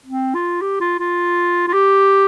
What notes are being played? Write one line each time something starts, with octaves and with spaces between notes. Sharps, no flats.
C4
F4
G4
F4
F4
F4
G4